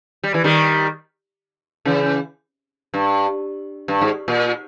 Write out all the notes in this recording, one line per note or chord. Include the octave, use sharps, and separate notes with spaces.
G3
E3
D#3 G3
C#3 E3
G2
G2
G#2
A#2